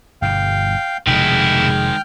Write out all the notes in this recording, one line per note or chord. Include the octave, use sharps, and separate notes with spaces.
G1 G2 B2 F5 G5
F1 B2 D#3 G#3 E4 G5 F6